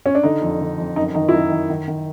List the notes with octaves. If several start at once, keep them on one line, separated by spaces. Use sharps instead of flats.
C#4
D4
D3 D#4
F2
D3
F2
F#2 D#4
D#3 D#4
E4
F#2 D#4
D#3
D#3
D#3